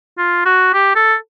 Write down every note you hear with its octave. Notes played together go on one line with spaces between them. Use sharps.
F4
F#4
G4
A4